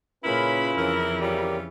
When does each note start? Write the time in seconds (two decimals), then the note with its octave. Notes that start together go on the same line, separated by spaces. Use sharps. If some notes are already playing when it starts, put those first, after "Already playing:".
0.24 A#2 C#3 C#4 E4 F4 A#4 B4 B5
0.77 F2 C#3 E3 A#4
1.20 G3 C#4 F4 G4 A#4 D5